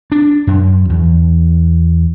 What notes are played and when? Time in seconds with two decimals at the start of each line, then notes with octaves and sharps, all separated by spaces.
0.12 D4
0.47 F#2
0.90 E2